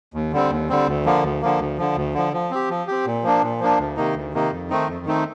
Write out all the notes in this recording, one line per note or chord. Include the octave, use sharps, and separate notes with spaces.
D#2
D3 G3 C4
D#2
D3 G3 C4
D2
D3 F3 A#3
D2
D3 F3 A#3
D2
D3 F3
D2
D3 F3
F3
C4 G4
F3
C4 G4
A#2
F3 A#3 D4
A#2
F3 A#3 D4
D2
C3 D#3 A#3 D#4
D2
C3 D#3 A#3 D#4
F2
D#3 A3 C4 D#4
F2
D#3 A3 C4 D#4